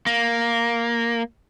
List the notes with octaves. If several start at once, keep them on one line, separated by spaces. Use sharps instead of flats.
A#3